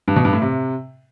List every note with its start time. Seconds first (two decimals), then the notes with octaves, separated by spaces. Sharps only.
0.08 G2
0.16 B2
0.25 G2
0.33 A2
0.42 C3